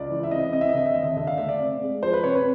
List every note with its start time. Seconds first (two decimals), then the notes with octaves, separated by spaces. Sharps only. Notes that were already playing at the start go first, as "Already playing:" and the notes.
Already playing: C#2 D5
0.10 E3
0.23 E5
0.31 C3 D#5
0.53 C3 D#5
0.61 E5
0.69 D#5
0.74 D3 E5
0.86 D#5
0.95 D#2 E5
1.02 D#5
1.17 D3 E5
1.27 F5
1.38 A3 E5
1.49 D5
1.60 C3
1.81 G#3
2.02 F3 C5
2.13 B4
2.24 C3 C#5
2.35 B4